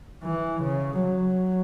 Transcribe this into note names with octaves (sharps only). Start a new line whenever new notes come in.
E3
C#3
F#3